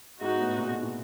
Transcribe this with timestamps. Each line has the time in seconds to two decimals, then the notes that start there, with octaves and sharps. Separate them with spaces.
0.21 G#2 B3 D#4 F#4
0.40 A2
0.57 A#2
0.70 B2
0.82 A#2